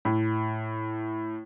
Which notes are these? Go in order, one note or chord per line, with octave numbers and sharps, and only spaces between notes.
A2